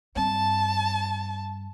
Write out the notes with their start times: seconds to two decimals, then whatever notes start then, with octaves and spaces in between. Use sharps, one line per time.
0.16 G2 C4 A5